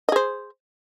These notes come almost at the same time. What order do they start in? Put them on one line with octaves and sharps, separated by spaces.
D#5 G#4 C5